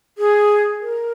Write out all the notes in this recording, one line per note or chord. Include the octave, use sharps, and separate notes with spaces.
G#4
A#4